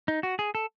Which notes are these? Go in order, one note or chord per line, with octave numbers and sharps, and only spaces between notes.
D#4
F#4
G#4
A4